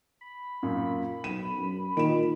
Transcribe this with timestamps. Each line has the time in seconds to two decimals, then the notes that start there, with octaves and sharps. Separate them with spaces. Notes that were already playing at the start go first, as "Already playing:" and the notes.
0.21 B5
0.63 F#2 A#2
1.24 B1 D#7 E7
1.59 F#2
1.97 A#2 D#3 D7 E7